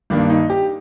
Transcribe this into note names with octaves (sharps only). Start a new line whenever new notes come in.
G2 D#3 A#3 D4
D#4
G4